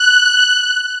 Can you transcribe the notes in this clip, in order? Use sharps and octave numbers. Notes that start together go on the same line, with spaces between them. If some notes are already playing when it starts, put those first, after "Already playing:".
Already playing: F#6